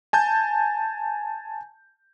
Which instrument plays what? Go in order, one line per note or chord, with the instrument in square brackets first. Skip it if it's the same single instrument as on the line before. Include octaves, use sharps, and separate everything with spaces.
[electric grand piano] G#5 A5 G6